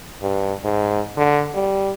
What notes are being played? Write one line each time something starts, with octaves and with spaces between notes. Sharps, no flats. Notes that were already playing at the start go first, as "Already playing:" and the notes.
G2
G#2
D3
G3